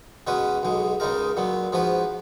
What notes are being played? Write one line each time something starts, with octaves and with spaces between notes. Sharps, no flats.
B2 G#3 C#4 F#4 B4
B1 B2 G#3
C#2 C#3 G#3 D#4 A#4
A#2 F#3 B3
G#2 F3 B3 F#4 B4